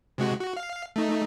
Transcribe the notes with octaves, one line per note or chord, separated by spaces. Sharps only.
C3 G#3 F#4
F#4
F5
A3 D#4